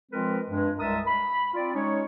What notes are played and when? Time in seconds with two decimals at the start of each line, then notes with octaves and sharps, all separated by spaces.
0.11 F3 G#3 C4 F4 A#4 B4
0.50 G2 G#3
0.79 C2 G#3 A#4 E5 A5 D#6
1.07 B5
1.54 C4 F4 D5
1.74 G#3 C#4 D#4 C#5